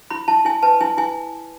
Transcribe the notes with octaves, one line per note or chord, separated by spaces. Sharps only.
E4 B5
E4 A5
E4 G#5
B4 A5
E4 G#5
E4 G#5